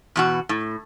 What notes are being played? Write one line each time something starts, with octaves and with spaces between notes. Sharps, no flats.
E2 B2 F#4
A2